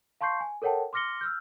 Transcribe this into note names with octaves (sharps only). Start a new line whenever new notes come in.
F5 A5 C6 C#6 G6 C7
G#5
A4 A#4 C#5 F#5 G5 A5
C6 D6 F6 A#6 C#7 G7
E6 F6 G6